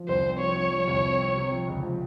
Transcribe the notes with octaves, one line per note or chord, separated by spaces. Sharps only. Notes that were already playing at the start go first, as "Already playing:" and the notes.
Already playing: F3
C2 C5
C4
F3 C#5
F3
F3
C2
C4
C4
C3
F3
C#2
F3